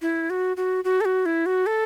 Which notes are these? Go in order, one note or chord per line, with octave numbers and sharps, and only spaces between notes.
E4
F#4
F#4
F#4
A4
F#4
E4
F#4
A4